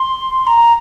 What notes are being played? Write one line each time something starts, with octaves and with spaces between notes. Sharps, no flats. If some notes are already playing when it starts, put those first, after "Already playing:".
Already playing: C6
A#5